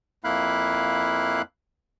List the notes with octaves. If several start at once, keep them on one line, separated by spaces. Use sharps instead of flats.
F2 A#3 E4 F5 B5 F#6